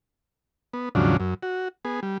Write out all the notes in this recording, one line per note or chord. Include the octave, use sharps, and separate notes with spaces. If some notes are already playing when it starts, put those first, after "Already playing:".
B3
D#2 G#2 C#3 F3 F#3 D4
F#2
F#4
B3 G#4
G3